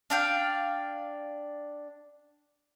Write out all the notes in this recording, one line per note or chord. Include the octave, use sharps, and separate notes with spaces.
D4 F5 G5